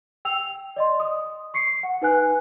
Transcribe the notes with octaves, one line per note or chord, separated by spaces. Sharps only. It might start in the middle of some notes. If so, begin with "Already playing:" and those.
G5 E6 F7
D5 D#5 C6
D#6
C#6 C7 C#7
F#5
D#4 B4 G#5 F#6